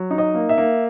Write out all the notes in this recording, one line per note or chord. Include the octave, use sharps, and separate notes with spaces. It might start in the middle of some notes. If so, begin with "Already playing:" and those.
Already playing: F#3
D#4
D#5
A#3
E5
A#3